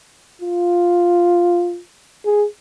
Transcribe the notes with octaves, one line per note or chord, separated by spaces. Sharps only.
F4
G#4